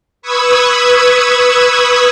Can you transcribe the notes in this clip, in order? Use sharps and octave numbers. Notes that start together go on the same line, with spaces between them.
B4 B5 C#6 D#6 E6 G#6